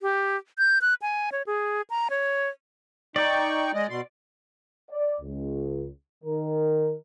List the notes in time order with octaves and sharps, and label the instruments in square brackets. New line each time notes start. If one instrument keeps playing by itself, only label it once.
[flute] G4
G6
F#6
G#5
C#5
G#4
A#5
C#5
[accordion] D#4 G5 C#6 [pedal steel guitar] D5
[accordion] G#3 D#5
B2 C6
[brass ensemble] D5
C#2
D#3 A#4